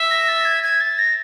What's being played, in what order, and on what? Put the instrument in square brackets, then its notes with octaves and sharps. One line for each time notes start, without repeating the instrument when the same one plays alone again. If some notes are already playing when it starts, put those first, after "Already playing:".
Already playing: [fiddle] E5
[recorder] A#6
A6
G#6
G#6
A6
A#6